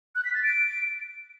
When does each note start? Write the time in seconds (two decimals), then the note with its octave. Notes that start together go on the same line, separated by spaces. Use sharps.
0.15 F#6
0.25 B6
0.34 A6
0.44 D7